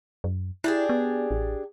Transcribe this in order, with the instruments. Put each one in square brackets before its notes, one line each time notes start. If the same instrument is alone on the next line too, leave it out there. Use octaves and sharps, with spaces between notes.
[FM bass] F#2
[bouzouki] D4 G4 G#4 [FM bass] E4
[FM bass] B3
A1